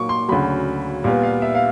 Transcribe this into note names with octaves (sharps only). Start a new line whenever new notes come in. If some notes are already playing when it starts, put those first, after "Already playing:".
Already playing: A#2 F#3 A#3 C#6 D6
C6
D2 C#3 F#3 B5
A#2 G3 B3 F5
F5
E5
F5